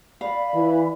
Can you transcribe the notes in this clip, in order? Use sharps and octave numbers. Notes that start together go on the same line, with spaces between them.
D5 F5 B5
E3